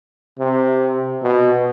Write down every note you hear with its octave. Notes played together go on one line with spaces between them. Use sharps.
C3
B2